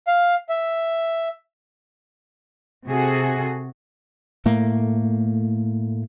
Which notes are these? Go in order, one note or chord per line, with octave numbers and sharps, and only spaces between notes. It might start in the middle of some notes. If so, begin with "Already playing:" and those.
F5
E5
C3 F#4 G#4 A4
A2 A3 A#3